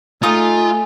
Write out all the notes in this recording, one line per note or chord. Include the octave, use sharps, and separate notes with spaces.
A3 D#4 F4 G#4 D#6